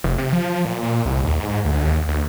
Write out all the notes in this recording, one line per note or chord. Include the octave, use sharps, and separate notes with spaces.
F1
C3
F3
A#2
A#2
C2
D#2
G#2
D2
D#2
D2